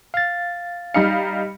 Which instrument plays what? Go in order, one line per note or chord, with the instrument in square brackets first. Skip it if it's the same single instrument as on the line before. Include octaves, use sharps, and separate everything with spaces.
[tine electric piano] F5 A6
[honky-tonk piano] G3 D#4 F5 [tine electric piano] C#7